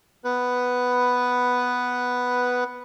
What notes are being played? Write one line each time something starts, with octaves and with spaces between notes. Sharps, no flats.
B3 B4